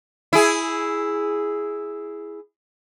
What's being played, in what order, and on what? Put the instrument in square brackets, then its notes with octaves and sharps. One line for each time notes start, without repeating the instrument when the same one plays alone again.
[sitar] E4 G#4